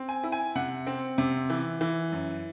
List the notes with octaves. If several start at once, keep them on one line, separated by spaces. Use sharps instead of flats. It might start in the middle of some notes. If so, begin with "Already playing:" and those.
Already playing: C4
G#5
E4
G#5
C3 F#5
C4
C3
E3
E3
F#2